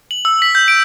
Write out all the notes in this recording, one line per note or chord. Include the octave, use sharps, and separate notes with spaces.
F#7
E6
B6
G6
D7